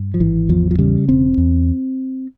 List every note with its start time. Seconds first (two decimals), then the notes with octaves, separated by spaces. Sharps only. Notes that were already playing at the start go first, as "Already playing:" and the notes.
Already playing: G2
0.14 F3
0.20 G#1 E3
0.49 E2 F3
0.71 F3
0.79 C#3 G3
1.09 E1 C4
1.38 E2